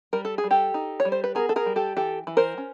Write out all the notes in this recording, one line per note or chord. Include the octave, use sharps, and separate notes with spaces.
G3 A#4
A4
G#4
G3
G4 A4
D#4
C#5
G3
C5
B4
B3 G#4 A#4
A4
G#4 A#4
G3
G4 A4
E3 G4 A4
E3
A#4 C5
C#4